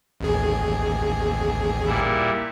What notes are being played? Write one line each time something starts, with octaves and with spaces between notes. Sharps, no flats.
A1 D#2 G#4
A#2 G3 E4